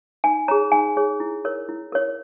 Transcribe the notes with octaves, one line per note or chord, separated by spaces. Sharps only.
D#4 G#5
G#4 C#5 A#5
D#4 G#5
G#4 C#5
E4
A#4 C#5
E4
A#4 C#5